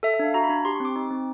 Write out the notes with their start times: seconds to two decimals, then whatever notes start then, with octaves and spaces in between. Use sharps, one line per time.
0.03 A4 E5
0.14 E5
0.19 D4 F5
0.34 F#4 A#5
0.44 B5
0.50 D4
0.65 G4 C6
0.75 C#6
0.80 C4 D6
0.96 D#4
1.11 C4